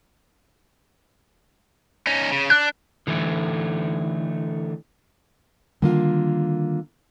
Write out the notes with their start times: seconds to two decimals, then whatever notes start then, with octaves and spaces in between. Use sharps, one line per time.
2.07 C#4 D#4
2.32 C#3
2.50 D4 F#6
3.07 D3 E3 A3
5.82 D3 D#3 G3 A#3 F4